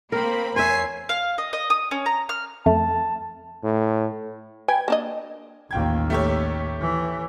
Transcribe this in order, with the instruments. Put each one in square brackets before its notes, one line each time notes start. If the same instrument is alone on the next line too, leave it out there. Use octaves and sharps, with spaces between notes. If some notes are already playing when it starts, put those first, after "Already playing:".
[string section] A#3 C4 B5 [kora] A#4
[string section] E2 C#5 C7 [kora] C5 E5 [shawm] G#5
[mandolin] F5
D#5
D#5
D#6
C#4
A#5
F6
[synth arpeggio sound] F2 A3 [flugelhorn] A5
[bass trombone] A2
[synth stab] B4 G5 G#6 [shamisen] G#5
[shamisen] A#3 D4 D#5
[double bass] A1 D#2 [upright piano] F4 G5 G#6
[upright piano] A3 G4 C#5
[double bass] E3